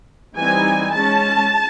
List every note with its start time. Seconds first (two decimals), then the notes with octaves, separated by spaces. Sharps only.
0.37 E3 G3 C4 D#4 G#5
0.94 G#3 C#4 A5